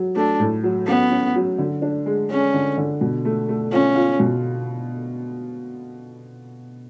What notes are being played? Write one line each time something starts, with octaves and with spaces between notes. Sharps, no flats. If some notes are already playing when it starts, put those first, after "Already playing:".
Already playing: F#3
A3 D4
A2
F#3
B3 C#4
C#4
F#3
D3
D4
G#3
G#3 C#4
D3
D3
B2
A3
A3
C#4 F4
F4
B2